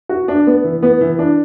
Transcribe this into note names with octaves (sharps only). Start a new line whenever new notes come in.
F#4
D4
B3
E3
B3
E3
D4